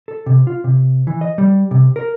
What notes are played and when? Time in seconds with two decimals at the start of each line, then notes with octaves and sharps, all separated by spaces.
0.08 A4
0.26 C3
0.47 F4
0.64 C3
1.07 E3
1.21 D#5
1.38 G3
1.71 C3
1.96 A#4